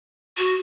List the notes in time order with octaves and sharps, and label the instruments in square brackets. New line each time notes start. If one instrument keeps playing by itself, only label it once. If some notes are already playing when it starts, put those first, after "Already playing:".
[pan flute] F#4